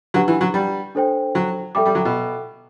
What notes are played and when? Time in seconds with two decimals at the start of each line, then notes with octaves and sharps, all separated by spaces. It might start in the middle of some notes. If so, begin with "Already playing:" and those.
0.14 F#3 D4 G4 B4 F#5
0.28 E3
0.41 F#3
0.54 G3
0.95 D4 A4 C5 G5
1.35 F#3
1.75 G3 A4 E5 G5 D6
1.86 G3
1.95 F#3
2.05 B2